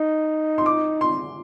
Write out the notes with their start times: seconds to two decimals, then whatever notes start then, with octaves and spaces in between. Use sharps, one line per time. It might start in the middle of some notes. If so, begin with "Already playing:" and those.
Already playing: D#4
0.58 C6
0.66 D6
1.01 C6